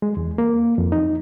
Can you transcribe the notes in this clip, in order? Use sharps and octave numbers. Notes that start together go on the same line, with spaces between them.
G#3
E2
A#3
F2
D#4